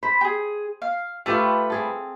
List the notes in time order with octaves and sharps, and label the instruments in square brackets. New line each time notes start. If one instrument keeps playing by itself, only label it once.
[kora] C5 [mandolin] B5
[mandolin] G4 G#4
F5
[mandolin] A3 B4 [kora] F4 G4 A4
[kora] C4 G#4 A4